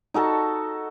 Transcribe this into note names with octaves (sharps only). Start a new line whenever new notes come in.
D#4 F#4 A4 A5